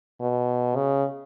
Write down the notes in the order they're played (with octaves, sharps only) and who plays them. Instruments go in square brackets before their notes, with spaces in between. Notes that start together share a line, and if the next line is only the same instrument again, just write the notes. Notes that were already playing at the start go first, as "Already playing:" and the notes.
[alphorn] B2
C#3